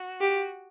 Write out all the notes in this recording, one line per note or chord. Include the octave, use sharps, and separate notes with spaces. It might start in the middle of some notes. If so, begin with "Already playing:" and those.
Already playing: F#4
G4